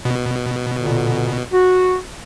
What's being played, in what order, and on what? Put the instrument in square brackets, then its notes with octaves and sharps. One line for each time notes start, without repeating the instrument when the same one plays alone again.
[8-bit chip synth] B2
[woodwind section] A#2 D3
F#4